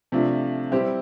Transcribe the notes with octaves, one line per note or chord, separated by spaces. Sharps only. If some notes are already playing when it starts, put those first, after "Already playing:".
C3 F3 A3 D4 F4
G3 C4 E4 G4 C5